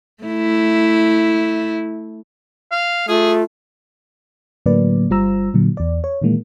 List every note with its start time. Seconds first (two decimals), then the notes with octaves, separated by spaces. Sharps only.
0.23 A3 E4
2.72 F5
3.09 A3 F4 G#4
4.66 A2 D3 F#3 A#3 B4 D5
5.10 G1 G3 F4 C5 A#5 E6
5.54 A#2 D3 F#3
5.77 E2 D5
6.04 C#5
6.22 A#2 D#3 E3 G#3 A#3